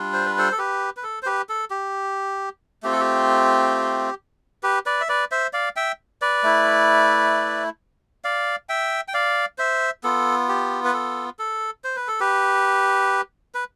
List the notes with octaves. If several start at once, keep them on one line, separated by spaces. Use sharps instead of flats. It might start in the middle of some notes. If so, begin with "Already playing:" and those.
Already playing: G3 D4 F4
C5
B4
A4 C5
A4
G4 B4
B4
A4
C5
G4 B4
A4
G4
A3 C4 F4 G4
A4
G4
G4 B4
B4 D5
E5
B4 D5
C5 E5
D5 F5
E5 G5
B4 D5
A3 E4
D5 F5
E5 G5
G5
D5 F5
C5 E5
B3 F4 A4
G4
B4
A4
A4
C5
B4
A4
G4 B4
B4